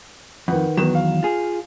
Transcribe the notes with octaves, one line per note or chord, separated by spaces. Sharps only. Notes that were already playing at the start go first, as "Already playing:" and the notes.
F2 D#3 B4 F#5
E2 D#3 F#3 B3 E7
F5
F4 G#4